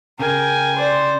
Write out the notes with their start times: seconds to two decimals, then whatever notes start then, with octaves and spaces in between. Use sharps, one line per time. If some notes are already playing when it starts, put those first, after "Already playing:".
0.20 C#3 A#4 G5 G#5
0.77 C5 D5